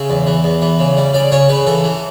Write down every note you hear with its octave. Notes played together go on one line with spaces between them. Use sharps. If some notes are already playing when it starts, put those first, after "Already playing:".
Already playing: C#3 E5
E2
E3
E2
E3
C#3
G3
C#3 D5
C#3 C#5
C#3 B4
E3 A4
E3